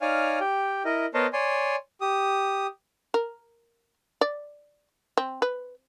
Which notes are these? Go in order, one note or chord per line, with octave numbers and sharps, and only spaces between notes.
D#4 C#5 D5 F5 G#5 F6
G4 G5
E4 A#4 D#5
B3 A#4 C5 C#5 D#5 A5
C#5 D5 G#5 C6
G4 D#6
A#4
D5
C4
B4